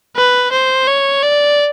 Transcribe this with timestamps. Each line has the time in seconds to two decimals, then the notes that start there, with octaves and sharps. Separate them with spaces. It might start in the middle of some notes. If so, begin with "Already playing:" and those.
0.16 B4
0.52 C5
0.87 C#5
1.23 D5